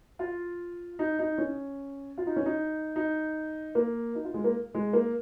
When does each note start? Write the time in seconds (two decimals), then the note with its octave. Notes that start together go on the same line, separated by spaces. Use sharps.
0.19 F4
0.99 D#4
1.19 D#4
1.38 C#4
2.18 F4
2.27 D#4
2.36 C#4
2.46 D#4
2.96 D#4
3.75 A#3
4.15 D#4
4.25 F4
4.34 G#3
4.44 A#3
4.74 G#3
4.93 A#3